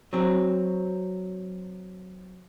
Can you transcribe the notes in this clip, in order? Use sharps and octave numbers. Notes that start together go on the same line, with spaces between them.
F#3 C4